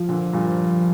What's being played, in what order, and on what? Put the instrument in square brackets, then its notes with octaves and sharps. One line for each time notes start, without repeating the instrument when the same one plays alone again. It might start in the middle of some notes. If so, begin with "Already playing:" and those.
Already playing: [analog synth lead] F3
[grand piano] A#2 D3
G2 A#2